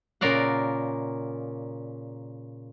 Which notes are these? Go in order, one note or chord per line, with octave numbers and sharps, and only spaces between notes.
A#2 C#3 A#4 D5 F5 F#5